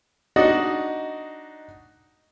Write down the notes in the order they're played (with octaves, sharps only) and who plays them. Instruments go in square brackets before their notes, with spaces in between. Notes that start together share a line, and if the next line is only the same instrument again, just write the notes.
[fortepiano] D4 D#4 F#4 D5 D#5